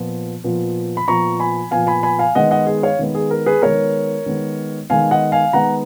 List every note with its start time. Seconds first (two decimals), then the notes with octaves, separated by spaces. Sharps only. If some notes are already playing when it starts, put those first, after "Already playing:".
Already playing: A#2 F3 B3
0.44 A#2 F3 B3
0.97 B5
1.08 A#2 F3 B3 A#5 C#6
1.40 G#5 B5
1.71 A#2 F3 B3 F5 G#5
1.87 G#5 B5
2.03 G#5 B5
2.19 F5 G#5
2.35 D#3 G#3 B3 D#5 F#5
2.51 D#5 F#5
2.67 G#4
2.83 C#5 F5
2.99 D#3 G#3 B3
3.15 G#4
3.31 A#4
3.46 G#4 B4
3.62 D#3 G#3 B3 A#4 C#5
4.26 D#3 G#3 B3
4.90 D#3 G#3 B3 F5 G#5
5.11 D#5 F#5
5.32 F5 G#5
5.53 D#3 G#3 B3 F#5 A#5